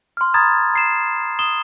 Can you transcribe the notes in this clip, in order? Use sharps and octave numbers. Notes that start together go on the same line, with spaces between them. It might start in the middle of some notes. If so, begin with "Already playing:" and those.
C6 F6
A#5 B5 D#6 G#6 A6
A#5 C7 E7
D#6 E7 G7